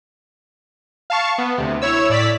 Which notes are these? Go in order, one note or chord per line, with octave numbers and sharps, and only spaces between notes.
F5 A5 C#6
B3
D2 C3
E4 C#5 E6
A2 D5 E6 B6